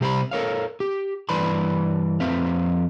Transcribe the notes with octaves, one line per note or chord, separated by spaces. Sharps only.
C3 G3 G4 C5 D5 B5
A4 A#4 C#5 F5
G4
G2 E3 B4 D5 B5 C6
F2 F3 C4 B4 E5 F5